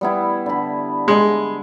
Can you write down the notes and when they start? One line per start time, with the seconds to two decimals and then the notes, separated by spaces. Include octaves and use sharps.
0.01 G3 B3 E4
0.46 D3 B5
1.08 G#3